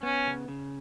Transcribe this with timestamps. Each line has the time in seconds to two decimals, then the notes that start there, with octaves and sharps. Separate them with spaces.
0.03 B3 C#4
0.26 C#3
0.48 C#3